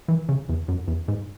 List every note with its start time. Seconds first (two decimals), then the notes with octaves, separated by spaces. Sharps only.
0.08 E3
0.29 C#3
0.49 E2
0.68 F#2
0.88 E2
1.08 G#2